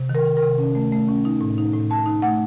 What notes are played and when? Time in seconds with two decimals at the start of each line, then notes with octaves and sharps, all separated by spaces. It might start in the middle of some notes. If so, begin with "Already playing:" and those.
Already playing: C3
0.09 D#3
0.15 A#4
0.25 D#3
0.37 A#4
0.42 C3
0.58 C#4
0.75 A3
0.92 A3
1.08 C#4
1.25 D#4
1.41 A2
1.58 D#4
1.73 A2
1.90 A2 A5
2.06 D#4
2.22 A3 F#5